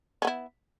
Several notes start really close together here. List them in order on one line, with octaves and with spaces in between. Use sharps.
C#4 B3 E4